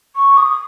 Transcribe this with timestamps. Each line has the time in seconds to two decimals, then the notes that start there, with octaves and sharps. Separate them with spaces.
0.15 C#6
0.37 D#6